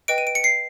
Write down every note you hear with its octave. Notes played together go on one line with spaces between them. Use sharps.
B4 D#5 G5 D7
D#7
D7
C#7
C7